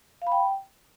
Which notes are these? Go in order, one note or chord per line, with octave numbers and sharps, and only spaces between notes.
F5
B5
G5